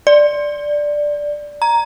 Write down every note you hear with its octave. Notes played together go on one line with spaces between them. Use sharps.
D5
A#5